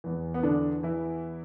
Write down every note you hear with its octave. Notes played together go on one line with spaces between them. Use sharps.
E2 E3
B3
D3 D4
E3 E4